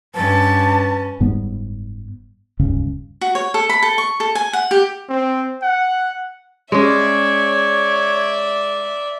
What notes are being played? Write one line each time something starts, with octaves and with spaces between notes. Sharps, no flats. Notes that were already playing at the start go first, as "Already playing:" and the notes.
G2 C#4 B4 A5
F#1 G#2 G3 B3
D#1 C#2 G2 C#3
F#4
C#5
A4
B5
A4
C#6
A4
G#5
F#5
G4
C4
F#5
G#3 C#4 C#5 D5 E5